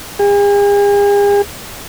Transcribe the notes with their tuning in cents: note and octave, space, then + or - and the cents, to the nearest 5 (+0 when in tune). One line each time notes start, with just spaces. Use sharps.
G#4 -45